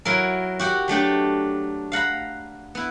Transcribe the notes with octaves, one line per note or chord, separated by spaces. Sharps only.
F#3 E4 A#4
F#4 G4 F#5
F#3 A3 D4 G4
F5 F#5 A#5 B5
B3 E4